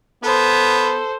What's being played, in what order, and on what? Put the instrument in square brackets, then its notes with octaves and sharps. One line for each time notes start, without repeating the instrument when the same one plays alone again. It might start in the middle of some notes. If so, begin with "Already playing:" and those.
[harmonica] B3 [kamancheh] A4 C5